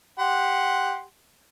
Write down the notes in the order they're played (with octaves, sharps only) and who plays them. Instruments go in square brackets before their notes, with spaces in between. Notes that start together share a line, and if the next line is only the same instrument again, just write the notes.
[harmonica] G4 F#5 C6